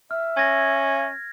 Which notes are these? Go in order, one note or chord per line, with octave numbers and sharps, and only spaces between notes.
E5 F6
C#4 G#6 A#6